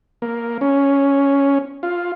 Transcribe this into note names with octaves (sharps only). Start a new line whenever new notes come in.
A#3
C#4
F4